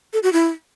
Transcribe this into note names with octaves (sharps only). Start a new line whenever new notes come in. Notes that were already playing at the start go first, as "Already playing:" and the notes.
A4
F#4
E4